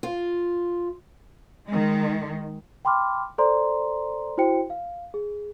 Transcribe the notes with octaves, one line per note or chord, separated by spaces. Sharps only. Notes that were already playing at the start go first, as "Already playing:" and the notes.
F4
D#3 G#3
G5 B5 C6 D6 F6
A4 C5 D5 A#5 C6
E4 F#4 C5 G5 C#7
F5
G#4